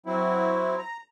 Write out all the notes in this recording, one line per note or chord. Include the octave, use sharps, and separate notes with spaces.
F#3 C4 E4
A#5